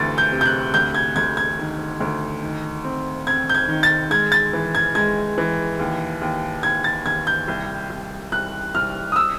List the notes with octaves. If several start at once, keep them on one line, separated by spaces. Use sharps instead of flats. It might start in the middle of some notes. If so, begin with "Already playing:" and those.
Already playing: D2 C3 E3 A6
G6
C3
G6
F#6
D2 G6
G#6
D2 G#6
G#6
D#3
D2
D#3
C4
C4 G#6
G6
G#6
D#3
A6
G#3 G#6
A6
E3
G#6
G#3 G#6
E3
D#2
D#2
D#2 G#6
A6
D#2 G#6
G6
C2
C2
C2 F#6
C2 F6
D#6
E6